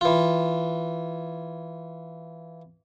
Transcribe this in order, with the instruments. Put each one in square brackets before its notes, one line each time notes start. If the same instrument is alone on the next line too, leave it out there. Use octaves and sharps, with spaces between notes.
[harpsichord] E3 F4